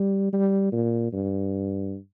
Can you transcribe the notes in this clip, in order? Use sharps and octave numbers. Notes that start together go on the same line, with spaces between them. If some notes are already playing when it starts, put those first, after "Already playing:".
Already playing: G3
G3
A#2
G2